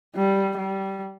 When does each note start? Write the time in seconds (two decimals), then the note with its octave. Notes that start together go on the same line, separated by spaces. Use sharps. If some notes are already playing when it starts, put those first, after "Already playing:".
0.15 G3
0.57 G3